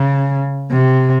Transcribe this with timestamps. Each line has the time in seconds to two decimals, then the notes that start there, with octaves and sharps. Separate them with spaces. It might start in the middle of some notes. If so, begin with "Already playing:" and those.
Already playing: C#3
0.71 C3